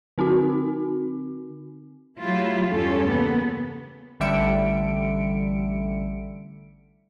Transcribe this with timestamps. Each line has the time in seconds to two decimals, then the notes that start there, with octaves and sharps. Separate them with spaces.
0.18 D3 C4 D#4 F#4
2.20 F#3 A3 E4 F4 G4
2.68 E2 G2 C#4 F4 G4 A4
3.09 C#3 A#3 B3
4.20 A1 D3 G3 E5 C#7 D7